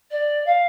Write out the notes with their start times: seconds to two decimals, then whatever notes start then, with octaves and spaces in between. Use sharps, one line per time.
0.10 D5
0.46 F5